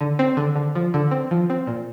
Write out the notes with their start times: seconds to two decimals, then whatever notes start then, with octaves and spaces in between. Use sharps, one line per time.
0.01 D3
0.19 C4
0.37 D3
0.56 D3
0.75 F3
0.94 D3
1.11 C4
1.31 F3
1.50 C4
1.67 A#2